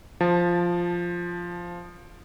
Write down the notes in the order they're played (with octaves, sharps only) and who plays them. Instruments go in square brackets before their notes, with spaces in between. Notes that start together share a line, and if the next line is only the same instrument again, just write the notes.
[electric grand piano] F3 A5